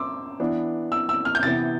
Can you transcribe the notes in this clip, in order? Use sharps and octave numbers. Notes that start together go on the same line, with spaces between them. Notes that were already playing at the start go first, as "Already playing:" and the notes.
Already playing: C6 D6 E6
E3 B3 D4
E6
E6
F6
G6
C3 E3 B3 A6